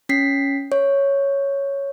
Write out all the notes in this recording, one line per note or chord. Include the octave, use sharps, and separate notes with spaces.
C#4 B6 C7
C#5